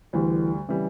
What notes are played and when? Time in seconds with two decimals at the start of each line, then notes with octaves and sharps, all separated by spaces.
0.13 D2 D3 E3 G3
0.68 C#3 E3 G3